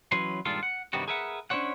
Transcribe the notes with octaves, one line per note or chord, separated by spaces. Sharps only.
E3 F#3 C#4 B4 C6
G2 A#2 D#3 G#3 F4 A4
F#5
G2 C3 D#3 G3 B3 F#4
G#4 A#4 B4 E5 F#5
C#4 D4 E4 C5 C#5 F#5